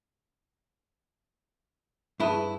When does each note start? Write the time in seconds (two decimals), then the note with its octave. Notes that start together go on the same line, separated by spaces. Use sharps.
2.20 G2 E4 G#4 B4 E5 A5